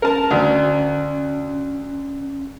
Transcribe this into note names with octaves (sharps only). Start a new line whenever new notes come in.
C#4 A#4 A5
D2